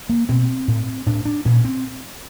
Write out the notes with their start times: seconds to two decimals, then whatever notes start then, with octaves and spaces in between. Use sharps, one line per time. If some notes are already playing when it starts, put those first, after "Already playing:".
0.09 A#3
0.29 B2 C4
0.68 A2
1.06 A2 D4
1.25 D4
1.45 A#2 C#4
1.65 C4